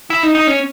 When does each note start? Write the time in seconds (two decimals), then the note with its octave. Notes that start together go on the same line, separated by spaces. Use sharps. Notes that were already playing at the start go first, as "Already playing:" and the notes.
0.10 E4
0.23 D#4
0.35 D#4
0.47 C#4